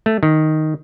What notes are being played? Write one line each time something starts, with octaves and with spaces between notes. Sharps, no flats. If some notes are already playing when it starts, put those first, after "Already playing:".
A3
D#3